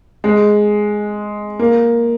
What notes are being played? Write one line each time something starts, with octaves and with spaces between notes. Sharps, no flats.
G#3
A#3